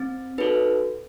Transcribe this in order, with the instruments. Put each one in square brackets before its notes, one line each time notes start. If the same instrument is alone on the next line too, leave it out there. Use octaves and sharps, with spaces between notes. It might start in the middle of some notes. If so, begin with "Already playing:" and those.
Already playing: [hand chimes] C4
D#4 F#4 A4 B4